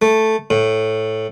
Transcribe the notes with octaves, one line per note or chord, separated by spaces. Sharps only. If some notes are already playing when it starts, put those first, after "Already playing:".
A3
A2